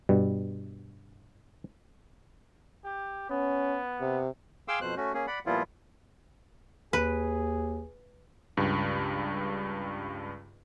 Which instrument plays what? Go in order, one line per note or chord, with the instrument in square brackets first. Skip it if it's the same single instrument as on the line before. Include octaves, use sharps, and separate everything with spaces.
[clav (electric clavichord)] G2 B2 G3
[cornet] G4
[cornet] B3 [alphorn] C#4
[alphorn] C3
[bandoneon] G#4 F5 G5 C6 D6 E6
F2 B2 C5 F#6
A3 C#4 F#4
A#3 C#4 G#4
D5 F#5 B5
A#2 F3 G3 B3 E4 F4
[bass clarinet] D#2 [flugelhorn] G#4 [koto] B4
[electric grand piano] C#2 G2